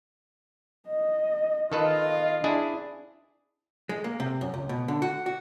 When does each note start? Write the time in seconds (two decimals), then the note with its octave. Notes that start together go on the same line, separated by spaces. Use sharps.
0.89 D#5
1.72 D#3 F4 A4 B4 D#5
2.44 D4 E4 G#4
3.89 G#3
4.04 A#3
4.20 C3
4.41 F#2
4.54 C#2
4.69 B2
4.88 D3
5.02 F#4
5.26 F#4